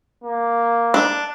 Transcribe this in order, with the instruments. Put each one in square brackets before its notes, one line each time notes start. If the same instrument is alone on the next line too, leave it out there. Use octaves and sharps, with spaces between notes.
[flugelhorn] A#3
[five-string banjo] D4